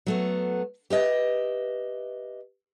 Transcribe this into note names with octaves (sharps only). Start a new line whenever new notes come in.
F#3 A3 B3
G4 B4 D#5 E5